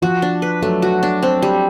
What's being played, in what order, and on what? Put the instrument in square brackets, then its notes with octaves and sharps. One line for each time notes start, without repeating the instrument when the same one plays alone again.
[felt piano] F3 [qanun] F#4
[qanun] D4
B4
[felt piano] F#3 [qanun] A3
[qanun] F#4
D4
C4
G3